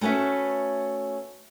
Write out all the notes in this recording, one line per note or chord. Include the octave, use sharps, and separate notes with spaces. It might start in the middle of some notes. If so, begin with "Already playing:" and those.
A3 C#4 F#4 B4 E5